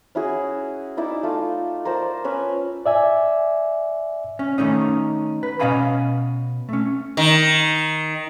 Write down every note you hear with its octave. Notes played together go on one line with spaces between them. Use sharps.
C#4 E4 F#4 G#4
D#4 E4 D5
A3 F4
A#4 C5 D5 A5
C#4 B4 E5
D5 E5 G#5
C#4
D#3 A3 C#4 D#4
B4
B2 C#4 D#5 F5 G#5 B5
A3 C#4
D#3